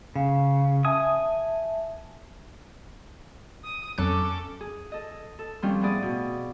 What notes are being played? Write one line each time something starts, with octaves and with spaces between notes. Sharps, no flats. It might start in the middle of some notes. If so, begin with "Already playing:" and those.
C#3 F5
E5 G#5 A5 D#6
D#6
F2 F#3 C#4 A4 D6 F#6
G#4
A4 D#5
A4
D#3 F3 G3 C4 C#4 F4
A2 B3 G#4 D5 D#6
B2